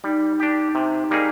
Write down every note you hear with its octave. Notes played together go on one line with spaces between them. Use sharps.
G3 D#4
D4 G4
C3
G3 A#3 D#4 G#4